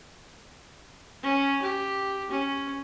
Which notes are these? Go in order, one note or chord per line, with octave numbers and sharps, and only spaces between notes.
C#4
G4
C#4